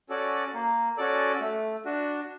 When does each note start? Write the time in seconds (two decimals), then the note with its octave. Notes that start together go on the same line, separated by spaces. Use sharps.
0.09 C#4 F#4 A4 D5
0.54 A#3
0.97 C#4 F#4 A4 D5
1.41 A3
1.85 D4 F#4